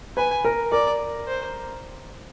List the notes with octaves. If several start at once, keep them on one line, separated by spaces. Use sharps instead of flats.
B4 G#5 B5
A#4 A#5
A#4 D5 A#5
C5